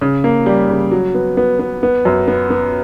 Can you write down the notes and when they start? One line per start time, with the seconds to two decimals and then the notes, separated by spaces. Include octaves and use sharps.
0.01 C#3
0.24 A#3
0.46 G3
0.69 C#3
0.91 F#3
1.14 B3
1.37 B3
1.59 B3
1.83 B3
2.05 F#2
2.28 B3
2.50 B3